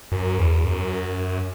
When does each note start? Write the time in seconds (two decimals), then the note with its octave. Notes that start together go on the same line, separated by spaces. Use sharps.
0.12 F#2
0.39 E2
0.65 F#2